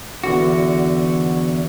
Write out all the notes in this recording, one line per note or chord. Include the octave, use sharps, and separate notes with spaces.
E2 D3 F#4